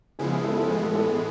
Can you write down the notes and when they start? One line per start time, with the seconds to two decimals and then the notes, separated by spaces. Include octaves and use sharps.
0.19 C#3 F3 G#3 B3 E4 G#4
0.32 G#4
0.45 A4
0.57 A4
0.70 A2 E3 G#3 B3 G#4
0.83 A4
0.95 A4
1.09 G#4